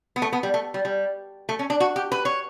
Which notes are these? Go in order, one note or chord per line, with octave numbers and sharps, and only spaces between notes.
B3
A3
B3
G3
A3
G3
G3
A3
C#4
D4
F#4
G4
B4
C#5